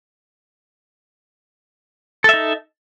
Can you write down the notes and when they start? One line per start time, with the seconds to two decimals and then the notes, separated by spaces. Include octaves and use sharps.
2.24 A4
2.29 E5
2.34 D#4